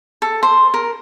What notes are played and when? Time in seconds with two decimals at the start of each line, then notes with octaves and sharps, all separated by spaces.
0.22 A4
0.43 C5
0.74 A#4